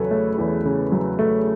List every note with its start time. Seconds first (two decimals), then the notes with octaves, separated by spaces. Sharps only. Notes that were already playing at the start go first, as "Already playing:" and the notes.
Already playing: E2 C#3 F#3 A4 B4 C#5
0.11 A3
0.38 E2
0.65 C#3
0.92 F#3
1.19 A3